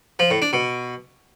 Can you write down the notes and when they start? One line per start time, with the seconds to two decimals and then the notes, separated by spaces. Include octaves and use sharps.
0.19 F3
0.31 A2
0.42 D4
0.53 B2